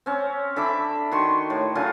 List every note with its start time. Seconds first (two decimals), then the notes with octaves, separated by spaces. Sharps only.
0.06 C4 C#4
0.56 D3 E5 B5 D6
1.12 D#3 F#4 C6 C#6
1.50 A2
1.75 D3 F#3 C#4 F4